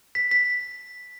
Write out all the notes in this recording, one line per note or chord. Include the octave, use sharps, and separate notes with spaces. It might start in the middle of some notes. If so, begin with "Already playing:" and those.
B6
B6